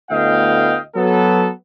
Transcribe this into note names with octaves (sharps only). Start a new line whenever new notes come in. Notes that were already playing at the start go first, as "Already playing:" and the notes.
D2 A2 B3 D#5 F5 G5
F#3 B3 A4